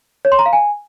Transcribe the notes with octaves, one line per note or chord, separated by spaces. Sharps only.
C#5
C6
A#5
F5
G#5